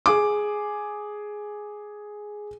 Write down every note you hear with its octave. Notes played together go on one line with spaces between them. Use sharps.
G#4 D6